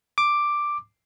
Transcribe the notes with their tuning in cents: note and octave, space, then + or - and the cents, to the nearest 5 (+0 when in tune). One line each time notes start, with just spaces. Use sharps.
D6 +5